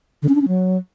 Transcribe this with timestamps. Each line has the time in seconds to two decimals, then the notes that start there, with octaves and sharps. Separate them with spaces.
0.22 D3
0.29 C#4
0.35 D4
0.41 C#4
0.48 F#3